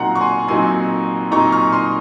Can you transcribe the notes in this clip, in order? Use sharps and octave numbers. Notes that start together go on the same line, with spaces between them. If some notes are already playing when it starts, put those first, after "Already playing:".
Already playing: A#2 F#3 C4 D#4 F5 F#5 A#5
C#6
G#5 C6
A#2 F#3 C4 D#4 G#5 C6
A#2 F#3 C4 D#4 A#5 C#6
C#6 F6
C6 D#6